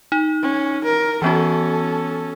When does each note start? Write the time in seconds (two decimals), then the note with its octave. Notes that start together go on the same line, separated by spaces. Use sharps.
0.12 D#4
0.42 C#4
0.84 A#4
1.22 E3 B3 C#4 F#4 A4